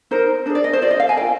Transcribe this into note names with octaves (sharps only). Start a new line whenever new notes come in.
D#4 A#4 C5
D4 G#4 C5
D5
D#5
C5
F4 G#4 D5
D#5
F5
G#5
F4 A#4 G5